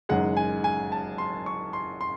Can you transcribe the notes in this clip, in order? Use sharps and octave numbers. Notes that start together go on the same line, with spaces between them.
F#1 F#2 D#3 G#3 F#5
G#5
G#5
A5
C6
C#6
C6
C6